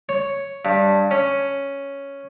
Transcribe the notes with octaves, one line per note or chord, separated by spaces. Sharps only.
C#5
G2
C#4